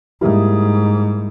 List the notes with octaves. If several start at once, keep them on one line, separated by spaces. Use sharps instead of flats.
G#2 G3 A#3 E4 G4